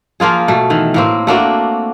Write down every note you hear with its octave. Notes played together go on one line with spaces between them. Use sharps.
F3 A#3 F4 G#4
B2 A3
D#3 E3
A2 A#3 C4
A3 A#3 D4 F#4